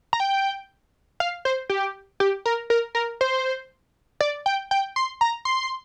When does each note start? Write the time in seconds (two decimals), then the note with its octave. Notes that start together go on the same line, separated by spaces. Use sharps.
0.13 A#5
0.20 G5
1.20 F5
1.45 C5
1.70 G4
2.20 G4
2.46 A#4
2.70 A#4
2.95 A#4
3.21 C5
4.21 D5
4.46 G5
4.71 G5
4.96 C6
5.21 A#5
5.45 C6